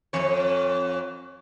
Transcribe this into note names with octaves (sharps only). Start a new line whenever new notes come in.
F2 C#5